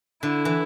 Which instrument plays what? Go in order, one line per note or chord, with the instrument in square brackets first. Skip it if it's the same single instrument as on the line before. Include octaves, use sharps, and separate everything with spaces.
[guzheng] D3 [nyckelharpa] E4
[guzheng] E3